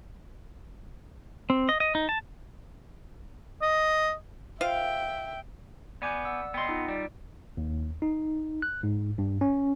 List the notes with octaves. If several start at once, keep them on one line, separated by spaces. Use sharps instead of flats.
C4
D#5
D#5
D#4
A5
D#5
F4 C5 E5 F5 G5
B3 D5 G#5 D6 G6
D5 F#5 E6
B3 D#5 G5 C6
D#4 F4
G3 D5
D#2
D#4
F#6
G#2
G2
C#4